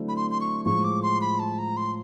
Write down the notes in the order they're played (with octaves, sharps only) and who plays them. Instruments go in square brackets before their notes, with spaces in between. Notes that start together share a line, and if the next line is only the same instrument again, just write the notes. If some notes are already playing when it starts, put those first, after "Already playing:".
Already playing: [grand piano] D3 F#3 A3 C4 E4
[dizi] B5
C6
C6
C#6
[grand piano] A2 F3 G#3 [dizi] C#6
[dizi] D6
C6
B5
A5
A#5
C6